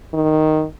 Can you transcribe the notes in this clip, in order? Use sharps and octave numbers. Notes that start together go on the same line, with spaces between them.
D#3